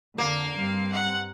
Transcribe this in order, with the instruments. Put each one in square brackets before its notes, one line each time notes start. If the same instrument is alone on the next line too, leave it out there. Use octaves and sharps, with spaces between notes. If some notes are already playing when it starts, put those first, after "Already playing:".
[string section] F2 D3 [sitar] A#3 [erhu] F5
[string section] G2 G3 C4
[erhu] F#5